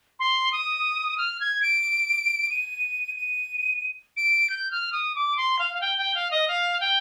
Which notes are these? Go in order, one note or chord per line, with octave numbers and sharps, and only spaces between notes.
C6
D#6
F6
G#6
D7
D#7
D#7
D7
G6
F6
D#6
D6
C6
F5
F5
G5
G5
F5
D#5
F5
G5